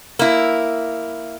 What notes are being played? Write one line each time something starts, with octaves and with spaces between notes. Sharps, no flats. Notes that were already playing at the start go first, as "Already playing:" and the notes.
A#3 E4